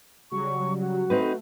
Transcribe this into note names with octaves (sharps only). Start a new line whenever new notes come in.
C#3 F#3 G3 C#6
F#4
A3 C4 D#4 B4